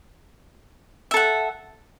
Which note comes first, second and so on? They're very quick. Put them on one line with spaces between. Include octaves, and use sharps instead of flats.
E5 A4 F#5